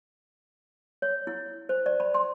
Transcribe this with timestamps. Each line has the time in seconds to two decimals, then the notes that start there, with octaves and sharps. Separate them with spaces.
1.02 C#5
1.27 E4
1.69 C5
1.86 D5
2.00 B5
2.14 C6